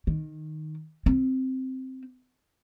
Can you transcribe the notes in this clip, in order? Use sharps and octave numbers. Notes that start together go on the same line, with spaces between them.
D#3
C4